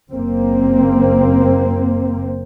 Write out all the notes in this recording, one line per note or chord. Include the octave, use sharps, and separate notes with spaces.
F#1 A#3 C4